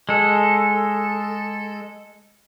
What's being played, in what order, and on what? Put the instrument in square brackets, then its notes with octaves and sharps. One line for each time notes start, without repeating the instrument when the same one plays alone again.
[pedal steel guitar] G#3 A4